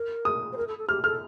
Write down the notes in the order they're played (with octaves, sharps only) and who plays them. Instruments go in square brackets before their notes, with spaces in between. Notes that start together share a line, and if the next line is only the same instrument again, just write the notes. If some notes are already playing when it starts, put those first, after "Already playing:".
Already playing: [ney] A#4
[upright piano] D#6
[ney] C5
A#4
A4
A4
[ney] G4 [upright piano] F6
[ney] A4 [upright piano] F6